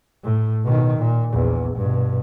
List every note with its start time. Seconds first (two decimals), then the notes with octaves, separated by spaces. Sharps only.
0.24 A2
0.63 B2 D#3
0.98 A#2
1.33 A#1 E2
1.76 G2 B2